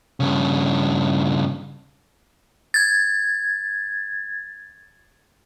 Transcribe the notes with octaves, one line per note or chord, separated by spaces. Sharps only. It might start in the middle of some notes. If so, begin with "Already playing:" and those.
G2 C#3
G#6 A6